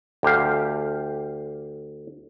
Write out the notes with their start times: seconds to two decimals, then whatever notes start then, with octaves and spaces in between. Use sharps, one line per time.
0.23 D2 G4 F5